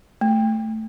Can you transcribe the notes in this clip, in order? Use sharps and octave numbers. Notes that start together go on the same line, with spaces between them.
A3